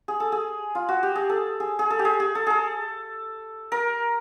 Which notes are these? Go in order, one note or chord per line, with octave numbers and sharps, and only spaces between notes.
G#4
A4
G#4
F4
F#4
G4
G#4
A4
G#4
G#4
A4
G4
G#4
G#4
A4
G#4 A4
A#4